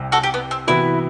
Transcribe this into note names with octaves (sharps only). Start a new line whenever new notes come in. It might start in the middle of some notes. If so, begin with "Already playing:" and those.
Already playing: C2 C3
F#4 A4
G4
B3
C4
C3 E3 B3 E4 F#4 B4